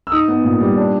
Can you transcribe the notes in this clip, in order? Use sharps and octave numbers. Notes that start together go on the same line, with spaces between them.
E6
D#4 D#6
B3
A#2
G3
D4